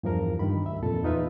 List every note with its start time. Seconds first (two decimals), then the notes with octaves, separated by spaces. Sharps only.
0.03 E2 G2 F3 A#4
0.39 G2 D#3 B5
0.66 D2 E5
0.83 F2 A#2 A4
1.03 E2 D#4 F4 B4 E5